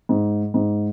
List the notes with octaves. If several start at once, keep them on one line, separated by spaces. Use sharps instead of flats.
G#2
G#2